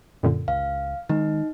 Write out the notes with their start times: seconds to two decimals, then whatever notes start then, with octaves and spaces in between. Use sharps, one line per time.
0.23 F#2 A#2 D3
0.48 C#2 F5
1.09 D#3 G#3 D#4